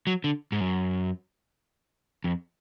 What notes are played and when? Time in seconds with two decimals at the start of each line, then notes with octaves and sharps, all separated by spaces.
0.07 F#3
0.24 D3
0.52 G#2
0.60 F#2
2.24 F2